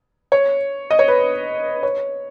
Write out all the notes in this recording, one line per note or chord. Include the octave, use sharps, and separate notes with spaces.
C#5
D#5
C#5
B4
C#5